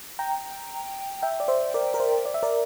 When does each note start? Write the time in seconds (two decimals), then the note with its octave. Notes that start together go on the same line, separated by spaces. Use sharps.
0.19 G5 A#5
1.22 E5 G5
1.40 D5
1.48 C5 E5
1.74 A#4 D5
1.94 A#4
2.00 C5
2.25 D5
2.34 E5
2.43 A#4 D5